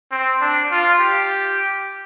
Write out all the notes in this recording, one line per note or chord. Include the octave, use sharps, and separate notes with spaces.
C4
D4
F4
G4